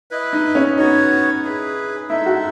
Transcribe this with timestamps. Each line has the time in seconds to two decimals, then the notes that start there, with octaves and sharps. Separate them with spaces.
0.11 E4 B4 D#5
0.33 D#4
0.55 C#4
0.77 B3 D#4 F#4 C#5
1.44 E4 G#4 B4
2.10 G#3 D#4 E4 A4 E5
2.26 F#4